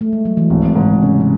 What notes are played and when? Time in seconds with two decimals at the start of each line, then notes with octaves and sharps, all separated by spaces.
0.01 A3
0.13 G#3
0.25 F#3
0.37 E3
0.50 G#1 D#3
0.75 G#2 C#3
1.02 C3 C#4
1.20 C#3